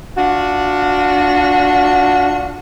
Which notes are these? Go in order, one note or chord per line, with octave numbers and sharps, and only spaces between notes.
D4 F4 F#4